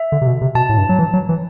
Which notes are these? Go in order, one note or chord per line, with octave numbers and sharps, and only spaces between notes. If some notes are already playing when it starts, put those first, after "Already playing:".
Already playing: E5
D3
C3
B2
C3
B2 A5
A2
G2
F#3
E3
F#3
E3